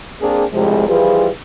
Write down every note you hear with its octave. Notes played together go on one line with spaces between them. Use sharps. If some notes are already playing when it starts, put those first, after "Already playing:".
A#3 C4 D4 G#4
C2 A2 C3 F3 G#3
E3 F3 G3 F4 G#4 B4